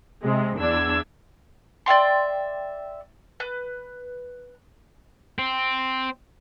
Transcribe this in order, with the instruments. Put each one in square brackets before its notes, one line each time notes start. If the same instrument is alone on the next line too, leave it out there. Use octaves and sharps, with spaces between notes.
[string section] C3 G#3
E2 D4 D5 E6 G#6
[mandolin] D5 E5 G5 C6
B4
[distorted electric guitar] C4